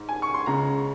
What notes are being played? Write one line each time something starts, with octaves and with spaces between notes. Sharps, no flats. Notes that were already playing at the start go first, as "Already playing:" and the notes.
Already playing: G#2
G#5
C#6
C6
C#2 C#3 A#5